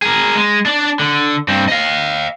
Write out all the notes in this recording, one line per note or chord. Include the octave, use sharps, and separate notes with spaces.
G#4 A#4
G#3
D4 D5
D3
G2 C4
D#5 F5